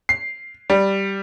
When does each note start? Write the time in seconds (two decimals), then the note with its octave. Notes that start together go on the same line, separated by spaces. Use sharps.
0.09 C7
0.70 G3